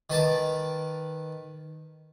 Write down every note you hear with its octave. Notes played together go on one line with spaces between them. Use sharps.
D#3 B4 A5 D6